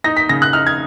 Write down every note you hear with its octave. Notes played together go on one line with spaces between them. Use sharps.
D#4 A#6
B6
C#3 A#6
F#6
D#4 F6
G#6